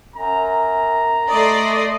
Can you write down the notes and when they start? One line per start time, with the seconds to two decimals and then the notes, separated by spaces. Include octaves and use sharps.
0.16 F#2 A#5
1.30 A3 D5 D#5 C6